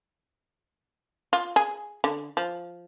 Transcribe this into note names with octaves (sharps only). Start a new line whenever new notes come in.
F4
G#4
D3
F3